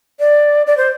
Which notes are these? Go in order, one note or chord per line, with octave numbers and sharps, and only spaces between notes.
D5
D5
C5